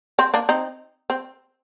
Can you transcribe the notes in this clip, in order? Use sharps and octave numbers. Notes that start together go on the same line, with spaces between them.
C4
A#3 D4
C4 D#4
C4